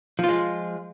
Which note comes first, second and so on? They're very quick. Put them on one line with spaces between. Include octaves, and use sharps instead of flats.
F3 F4 G#3